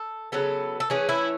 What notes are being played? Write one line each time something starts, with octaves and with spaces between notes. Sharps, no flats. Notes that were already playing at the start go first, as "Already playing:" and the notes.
Already playing: A4
C#3 F#3 B3 A4
A4
E3 A3 C#4 G#4
E4